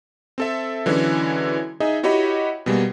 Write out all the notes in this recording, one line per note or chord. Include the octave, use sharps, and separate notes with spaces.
C4 A4 E5
D3 E3 F#3 G#3 C#4 E4
D#4 G#4 D#5 E5
E4 F#4 G4 C#5 D#5 B5
B2 G3 G#3 A#3